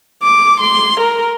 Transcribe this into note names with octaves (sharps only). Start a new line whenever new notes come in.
D6
C6
A#4